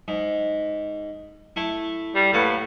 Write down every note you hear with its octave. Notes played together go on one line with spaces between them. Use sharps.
G#2
A3 E4
G3
A2 A#3 B4 F#5